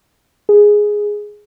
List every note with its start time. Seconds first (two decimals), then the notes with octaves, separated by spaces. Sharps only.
0.49 G#4